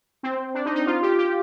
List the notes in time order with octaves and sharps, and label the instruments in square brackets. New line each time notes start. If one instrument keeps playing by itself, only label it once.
[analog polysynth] C4
D4
D#4
D#4
F4
G4
G4